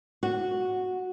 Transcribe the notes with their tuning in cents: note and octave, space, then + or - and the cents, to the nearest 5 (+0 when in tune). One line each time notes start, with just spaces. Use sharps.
F#4 -5